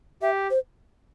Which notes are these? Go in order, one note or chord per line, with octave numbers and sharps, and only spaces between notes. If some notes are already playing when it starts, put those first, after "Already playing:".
G4 E5
C5